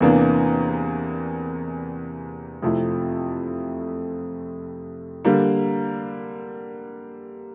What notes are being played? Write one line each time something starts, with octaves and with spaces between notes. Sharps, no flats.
E2 C3 E3 A#3 D4
F2 C3 F3 A3 E4
D3 G3 A#3